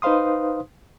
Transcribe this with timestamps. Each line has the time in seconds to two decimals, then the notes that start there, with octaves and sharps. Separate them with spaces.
0.02 D#4 B4 C5 F5 C6 D#6